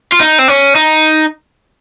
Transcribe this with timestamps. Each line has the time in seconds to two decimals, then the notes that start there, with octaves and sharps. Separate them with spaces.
0.12 F4
0.21 D#4
0.39 C4
0.48 C#4
0.75 D#4